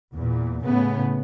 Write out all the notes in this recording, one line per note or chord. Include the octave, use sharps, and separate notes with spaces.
E2 A#2
A2 C#3 A3 B3